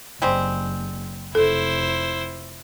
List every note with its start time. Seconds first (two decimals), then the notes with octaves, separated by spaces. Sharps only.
0.22 F#1 G3 G#3 C4
1.35 F1 F2 E4 A4 C5